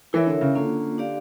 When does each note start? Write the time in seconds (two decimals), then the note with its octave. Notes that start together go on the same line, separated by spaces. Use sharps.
0.13 E3 E4 A#4 C#5 E5
0.27 D3
0.41 C#3
0.55 D3 A#3 C#4 F4
0.98 D4 G4 D5 F5